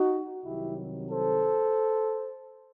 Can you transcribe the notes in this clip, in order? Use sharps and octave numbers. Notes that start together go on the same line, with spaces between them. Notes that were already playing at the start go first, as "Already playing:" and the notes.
Already playing: D#4 F#4
C2 C3 D#3 F#3 E4 G4
A4 C5